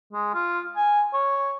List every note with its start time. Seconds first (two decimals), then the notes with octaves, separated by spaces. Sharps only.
0.13 G#3
0.34 F4
0.77 G#5
1.14 C#5